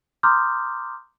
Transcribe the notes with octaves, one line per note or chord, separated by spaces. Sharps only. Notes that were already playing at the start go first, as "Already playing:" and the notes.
A#5 C6 D6 D#6 F6 G6